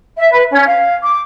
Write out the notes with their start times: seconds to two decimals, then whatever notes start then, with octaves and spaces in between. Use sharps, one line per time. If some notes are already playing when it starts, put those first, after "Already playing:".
0.16 E5
0.31 B4
0.50 C#4
0.66 F5
1.03 D6